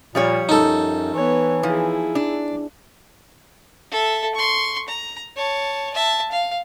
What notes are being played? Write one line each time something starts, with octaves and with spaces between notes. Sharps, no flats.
A#2 F3 G3 C#5
F#2 D#4 A4
E3 B3 C#5
F3 E4 G#4
D4
A4 E5
C6 C#6
A#5
C#5 A5
E5 A5
F5